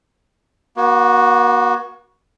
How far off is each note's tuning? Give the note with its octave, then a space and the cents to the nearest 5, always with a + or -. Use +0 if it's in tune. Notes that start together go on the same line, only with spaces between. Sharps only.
A#3 +45 F#4 +0